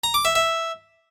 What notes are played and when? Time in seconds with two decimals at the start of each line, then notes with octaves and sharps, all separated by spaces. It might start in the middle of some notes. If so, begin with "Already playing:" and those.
0.04 A#5
0.14 D6
0.25 E5
0.35 E5